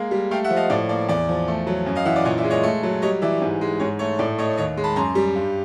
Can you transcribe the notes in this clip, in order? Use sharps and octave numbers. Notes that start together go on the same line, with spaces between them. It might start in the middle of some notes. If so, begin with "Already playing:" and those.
Already playing: G#3 A#3
G3
A3 F5 G5
E5 F#5
F3
D#5 F5
A2 D5
A#3 D5
E2 D5
F3
A3
F#3
F#2
D#5 F5
E3 E5 F#5
D5
A#2 C#5 D#5
D5 E5
G#3
C#5 D#5
A3
F#3
G3 C#5 D#5
E3 D5 E5
G#2
G#3
G#2 C#5
A3 C#5
A2 D5
A3 C#5 D#5
D#2 C#5 D#5
G#3
A5 B5
F#2 A#5 C6
G3
G2